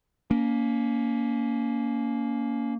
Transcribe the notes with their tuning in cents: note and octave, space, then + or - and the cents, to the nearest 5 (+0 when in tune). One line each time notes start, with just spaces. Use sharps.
A#3 +0 C#4 +30